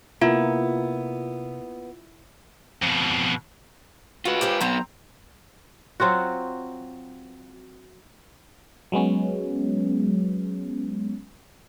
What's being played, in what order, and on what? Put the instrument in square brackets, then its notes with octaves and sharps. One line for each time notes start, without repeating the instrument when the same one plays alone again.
[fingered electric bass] C3 [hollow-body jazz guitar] A#3 B3 [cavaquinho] E4 [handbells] F4
[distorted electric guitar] F2 B2
[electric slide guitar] F4 B4 [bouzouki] F#4
[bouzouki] G4 A#4 C5
[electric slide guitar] F#3 B3 [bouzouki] C4 A#5
[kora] F#3 C4 F4 F#4
[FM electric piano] F#3 G#3 B3 C#4